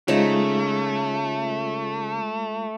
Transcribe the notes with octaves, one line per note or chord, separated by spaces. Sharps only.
C#3 G#3 A3 D#4 F4